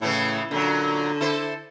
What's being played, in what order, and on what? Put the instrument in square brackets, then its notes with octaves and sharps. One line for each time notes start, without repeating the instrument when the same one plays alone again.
[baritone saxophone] A2 [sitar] C#3 E3 E4
[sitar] A#2 F#3 [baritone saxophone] D3
[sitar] E4 A4 C5